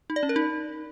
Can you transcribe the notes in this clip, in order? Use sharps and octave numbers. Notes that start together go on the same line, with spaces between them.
D#4
D5
C#4
A#4
D#4